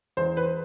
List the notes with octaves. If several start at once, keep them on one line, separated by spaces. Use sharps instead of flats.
E2 C5
B4